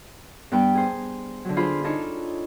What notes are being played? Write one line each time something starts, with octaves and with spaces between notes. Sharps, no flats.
G2 B3 B4 G5
G#4 C5
D3 F#3
D4 F4 G#4 C5 B5
D4 D#4 F4 A4 C#5